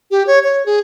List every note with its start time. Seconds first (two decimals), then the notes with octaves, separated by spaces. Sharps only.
0.11 G4
0.27 C#5
0.44 C#5
0.66 G#4